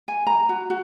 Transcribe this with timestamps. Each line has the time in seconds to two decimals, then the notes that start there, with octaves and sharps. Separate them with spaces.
0.08 G#5
0.27 A#5
0.49 F#4
0.70 F#4